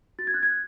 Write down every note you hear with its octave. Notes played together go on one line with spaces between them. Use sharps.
F#4 A6
G#6
F#6
G#6